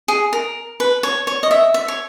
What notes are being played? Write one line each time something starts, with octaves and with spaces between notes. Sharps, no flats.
G#4
A#4
B4
C#5
C#5
D#5
E5
E5
C#5